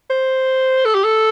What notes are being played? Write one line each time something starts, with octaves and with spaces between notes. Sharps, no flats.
C5
A4
G4
A4